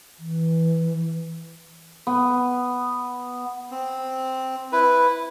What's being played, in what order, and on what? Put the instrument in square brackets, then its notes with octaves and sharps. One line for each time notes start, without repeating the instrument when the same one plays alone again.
[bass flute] E3
[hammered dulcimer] B3
[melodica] C4
E4 B4